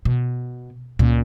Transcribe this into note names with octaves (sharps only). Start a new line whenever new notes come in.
B2
C#2 A#2